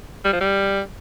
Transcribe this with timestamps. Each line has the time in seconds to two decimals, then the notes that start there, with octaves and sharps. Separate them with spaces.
0.25 G3
0.33 F3
0.41 G3